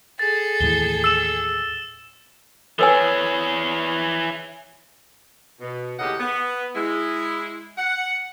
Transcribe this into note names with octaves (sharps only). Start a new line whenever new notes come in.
G#4 A4 A6
D#2 A2 E3 G7
E6 E7
E3 G#4 A4 B4 C#5 G#5 E6 A6
B2
D#2 A2 C#3 G4 D#5 F#5
B3
G#3 E4
F#5